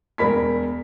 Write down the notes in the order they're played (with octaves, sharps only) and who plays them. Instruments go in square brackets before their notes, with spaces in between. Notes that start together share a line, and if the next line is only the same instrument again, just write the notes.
[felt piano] E1 A#4 B5 B6